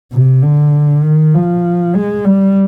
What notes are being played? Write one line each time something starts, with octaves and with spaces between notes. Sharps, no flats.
C3
D3
D#3
F3
G#3
G3